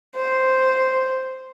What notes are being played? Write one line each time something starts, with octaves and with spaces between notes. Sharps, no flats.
C5